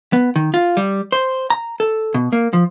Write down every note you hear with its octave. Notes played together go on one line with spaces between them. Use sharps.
B3
D#3
F4
G3
C5
A#5
A4
B2
A#3
F3